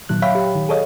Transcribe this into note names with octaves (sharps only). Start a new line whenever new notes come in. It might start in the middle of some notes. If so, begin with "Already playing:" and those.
A#2 D#3 F#3 F#6
C#5 E5 F5 G5 B5
G4
D#3
G#4 A4 C#5 D#5 F5